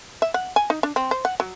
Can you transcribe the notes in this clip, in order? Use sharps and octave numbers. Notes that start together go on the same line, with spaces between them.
E5
F#5
G#5
D#4
D4
C4
C5
F#5
F#3